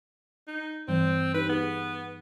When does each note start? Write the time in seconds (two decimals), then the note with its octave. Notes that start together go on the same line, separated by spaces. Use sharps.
0.48 D#4
0.88 G2 E3 G3 C4
1.35 D#4 G4 B4
1.49 B3 G#4 B4